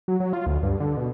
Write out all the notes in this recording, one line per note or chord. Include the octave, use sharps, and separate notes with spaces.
F#3
F#3
F4
D2
G2
D3
B2